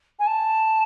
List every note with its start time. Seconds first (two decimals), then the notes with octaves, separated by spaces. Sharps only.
0.19 G#5
0.27 A5